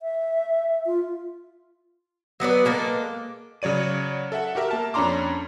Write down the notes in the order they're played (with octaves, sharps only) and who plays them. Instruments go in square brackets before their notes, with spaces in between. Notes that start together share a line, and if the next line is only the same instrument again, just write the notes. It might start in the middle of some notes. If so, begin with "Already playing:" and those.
[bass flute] E5
F4
[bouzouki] F#3 B3 B4 D5
G#3 A#3 D4 A4
[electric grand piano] C#3 F#3 C#5 D5 D#7
A4 E5 F#5
F#4 G4 A#4 E5
A#3 A5 F6
F2 C#4 D4 A#5 C6 D6